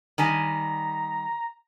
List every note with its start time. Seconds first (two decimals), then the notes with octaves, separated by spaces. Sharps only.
0.18 D#3 G3 G#5 A#5